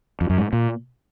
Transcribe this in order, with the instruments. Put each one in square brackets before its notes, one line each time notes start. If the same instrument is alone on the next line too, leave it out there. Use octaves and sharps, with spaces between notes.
[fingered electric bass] F2
F#2
G#2
A#2